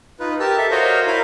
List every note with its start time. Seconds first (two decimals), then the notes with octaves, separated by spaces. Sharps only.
0.20 D#4 F4 B4
0.40 G4 A#4 A5 E6
0.58 A4 E5
0.71 F#4 A#4 C5 C#5 D#5 F5
1.06 E4 A#4 F5